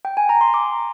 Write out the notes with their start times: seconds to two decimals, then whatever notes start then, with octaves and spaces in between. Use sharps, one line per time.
0.05 G5
0.17 G#5
0.29 A#5
0.41 C6
0.54 D6